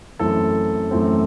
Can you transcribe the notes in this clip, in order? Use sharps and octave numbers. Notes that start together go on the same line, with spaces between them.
F#2 E3 A3 C4 A4
F#2 E3 A3 C4